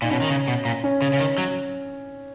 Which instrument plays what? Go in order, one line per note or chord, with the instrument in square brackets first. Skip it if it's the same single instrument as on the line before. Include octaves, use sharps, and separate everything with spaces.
[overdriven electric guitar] A#2 [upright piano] D#4
[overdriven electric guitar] B2 [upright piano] C#4
[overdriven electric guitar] D#3
C#3
B2
A#2
[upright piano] C#4
[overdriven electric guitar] C#3
C#3
D#3
F#3